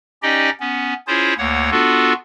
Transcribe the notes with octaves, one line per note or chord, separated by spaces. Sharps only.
C#4 D#4 G4 D5 D#5 G5
B3 C#4
C#4 E4 F4 G#4 C5 C#5
D2 A#3 C#5 F#5
B3 D4 F4 F#4 A4